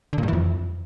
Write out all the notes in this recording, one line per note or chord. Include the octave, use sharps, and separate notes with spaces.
D3
A#2
G2
E3
F2